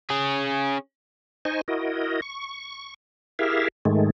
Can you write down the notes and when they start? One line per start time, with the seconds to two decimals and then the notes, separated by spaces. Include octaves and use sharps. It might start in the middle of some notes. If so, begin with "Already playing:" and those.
0.10 C#4 G#4
1.45 D#4 C5 D#5 G#5 C#6
1.68 E4 F#4 A#4 D#5
2.22 C#6
3.39 E4 G4 G#4 A#4 E5 F5
3.85 G#2 D#3 G#3 A3